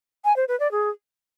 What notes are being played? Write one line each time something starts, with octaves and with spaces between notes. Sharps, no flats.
G#5
C5
B4
D5
G#4